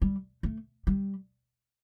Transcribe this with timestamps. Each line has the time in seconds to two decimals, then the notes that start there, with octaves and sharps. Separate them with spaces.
0.02 G3
0.43 A3
0.87 G3